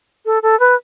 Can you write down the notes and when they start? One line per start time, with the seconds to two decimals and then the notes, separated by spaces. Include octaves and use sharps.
0.26 A4
0.43 A4
0.60 B4